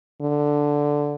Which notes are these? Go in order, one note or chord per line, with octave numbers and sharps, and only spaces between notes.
D3